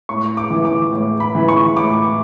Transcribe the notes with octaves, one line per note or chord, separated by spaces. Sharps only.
A2 C#6
D6
E3
D6
A2
B5
E3
C#6
A2 D6